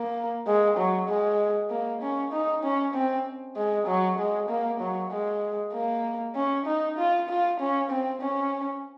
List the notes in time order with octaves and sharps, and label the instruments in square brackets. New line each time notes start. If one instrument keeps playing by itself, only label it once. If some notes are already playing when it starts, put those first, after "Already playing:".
Already playing: [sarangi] A#3
G#3
F#3
G#3
A#3
C#4
D#4
C#4
C4
G#3
F#3
G#3
A#3
F#3
G#3
A#3
C#4
D#4
F4
F4
C#4
C4
C#4